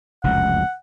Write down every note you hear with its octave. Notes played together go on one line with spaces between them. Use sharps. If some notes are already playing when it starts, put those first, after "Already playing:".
F1 C#2 F#2 F#5